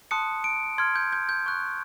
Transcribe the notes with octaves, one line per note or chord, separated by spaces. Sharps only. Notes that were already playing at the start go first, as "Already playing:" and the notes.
A5 C6 D#6 F#6 C#7
D7
C6 F6 G#6
G6
G6
G6
C#6 F#6